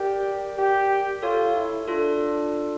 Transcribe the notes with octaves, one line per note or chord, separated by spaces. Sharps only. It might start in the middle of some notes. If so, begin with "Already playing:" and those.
Already playing: G4 A#4 D5
G4
F4 A4 C#5
E4
D4 F4 A4